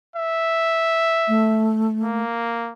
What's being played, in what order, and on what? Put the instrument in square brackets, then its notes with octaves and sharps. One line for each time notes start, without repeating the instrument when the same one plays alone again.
[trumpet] E5
[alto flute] A3
[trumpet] A#3